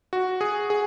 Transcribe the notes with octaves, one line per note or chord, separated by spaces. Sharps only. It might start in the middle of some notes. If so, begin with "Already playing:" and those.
F#4
G#4
G#4